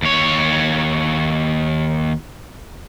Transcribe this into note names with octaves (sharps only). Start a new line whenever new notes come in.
D#2 C#5